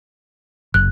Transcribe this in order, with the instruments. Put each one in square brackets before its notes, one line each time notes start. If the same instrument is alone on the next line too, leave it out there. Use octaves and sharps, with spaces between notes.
[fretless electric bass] F#1 [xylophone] F#6